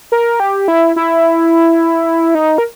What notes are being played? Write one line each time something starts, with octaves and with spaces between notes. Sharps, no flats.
A#4
G4
E4
E4
D#4
A#4